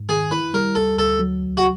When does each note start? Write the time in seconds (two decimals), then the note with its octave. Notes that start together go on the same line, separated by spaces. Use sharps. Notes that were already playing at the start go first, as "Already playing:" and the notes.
Already playing: G#2
0.09 D#3 G#4
0.31 E4 B4
0.54 G3 A#4
0.75 D2 A4
0.98 D2 A4
1.19 F#3
1.43 C2
1.57 F#4